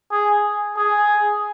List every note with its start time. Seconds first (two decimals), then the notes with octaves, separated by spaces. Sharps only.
0.11 G#4
0.76 G#4